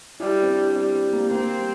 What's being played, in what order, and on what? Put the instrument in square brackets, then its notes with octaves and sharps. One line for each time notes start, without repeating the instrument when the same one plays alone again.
[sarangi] G3 [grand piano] E4
[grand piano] C4
D4
[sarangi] G3 [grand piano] C4
[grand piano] C4
A#3
[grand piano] A#3 [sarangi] C4
[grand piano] G3